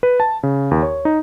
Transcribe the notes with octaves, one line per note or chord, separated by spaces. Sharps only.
B4
A5
C#3
D#2
C#5
D#4